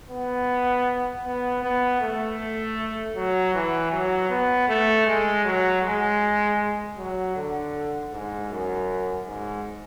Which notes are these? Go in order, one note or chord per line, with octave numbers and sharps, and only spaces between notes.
B3
B3
B3
A3
F#3
E3
F#3
B3
A3
G#3
F#3
G#3
F#3
D3
G#2
F#2
G#2